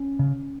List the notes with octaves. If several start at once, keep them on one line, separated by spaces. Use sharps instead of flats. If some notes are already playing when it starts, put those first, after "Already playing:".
Already playing: C#4
C#3